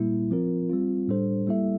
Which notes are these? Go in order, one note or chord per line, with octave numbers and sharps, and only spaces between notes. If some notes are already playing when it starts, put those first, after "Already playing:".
Already playing: A#2 G3 A#3 E4
F3 C4 F4 A#4
G3 C4 F4
A2 G3 D4 A4 C5
G3 A#3 E4 A4 E5